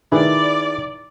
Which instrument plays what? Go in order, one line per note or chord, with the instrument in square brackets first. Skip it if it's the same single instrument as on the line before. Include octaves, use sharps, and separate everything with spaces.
[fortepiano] D#3 [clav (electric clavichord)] E4 G#4 B4 [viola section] D5